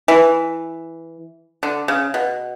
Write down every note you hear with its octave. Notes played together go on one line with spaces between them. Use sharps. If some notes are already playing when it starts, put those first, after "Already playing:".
E3
D3
C#3
B2